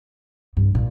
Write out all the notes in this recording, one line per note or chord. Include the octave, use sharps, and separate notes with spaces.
G2
A#2